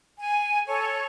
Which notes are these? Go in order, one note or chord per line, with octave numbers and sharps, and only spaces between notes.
G#5
A4 C#5